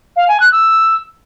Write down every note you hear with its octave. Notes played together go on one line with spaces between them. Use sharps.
F5
G#5
F#6
E6